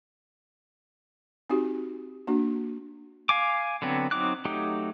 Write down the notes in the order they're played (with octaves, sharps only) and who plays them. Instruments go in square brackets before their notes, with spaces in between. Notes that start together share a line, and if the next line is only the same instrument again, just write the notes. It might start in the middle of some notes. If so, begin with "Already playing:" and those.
[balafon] C4 D#4 F#4 G4
A#3 D4 F#4
[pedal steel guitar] F5 G#5 D6
D3 F#3 B3 C4
F#3 C4 D#4 D6 F#6
F#3 A3 D#4 G4